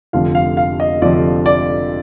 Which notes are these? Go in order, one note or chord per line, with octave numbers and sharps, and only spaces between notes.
F1 F2 D3 F3 F5
F5
F5
D#5
F1 F2 D3 F3 D5
D5